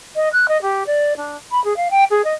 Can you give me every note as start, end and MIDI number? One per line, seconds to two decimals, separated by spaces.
0.15 0.29 75
0.32 0.46 90
0.48 0.60 75
0.61 0.83 67
0.86 1.16 74
1.16 1.37 62
1.51 1.62 83
1.64 1.76 68
1.76 1.88 77
1.90 2.04 79
2.10 2.21 68
2.24 2.34 75